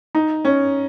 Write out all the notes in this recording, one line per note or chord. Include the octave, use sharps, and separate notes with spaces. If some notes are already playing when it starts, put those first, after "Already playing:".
D#4
C#4